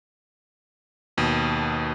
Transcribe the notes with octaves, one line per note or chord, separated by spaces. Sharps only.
D#2 B2